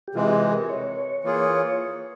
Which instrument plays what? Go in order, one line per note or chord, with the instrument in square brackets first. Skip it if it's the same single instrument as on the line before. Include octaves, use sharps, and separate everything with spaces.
[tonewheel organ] G4
[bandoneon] C3 E3 G#3 [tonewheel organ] F4
[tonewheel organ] G#4
A#4
C#5
[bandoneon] E3 A#3 F4 G#4